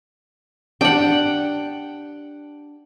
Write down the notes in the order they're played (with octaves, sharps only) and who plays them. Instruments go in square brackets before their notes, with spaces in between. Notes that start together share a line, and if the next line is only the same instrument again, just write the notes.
[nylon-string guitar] D4 G4 [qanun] F#5 G5